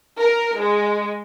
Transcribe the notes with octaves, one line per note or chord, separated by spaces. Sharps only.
A#4
G#3